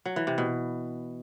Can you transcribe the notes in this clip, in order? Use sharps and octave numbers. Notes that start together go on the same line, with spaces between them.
F#3
E3
C3
B2